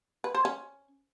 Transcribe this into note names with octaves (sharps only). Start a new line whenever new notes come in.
B4
C5
C#4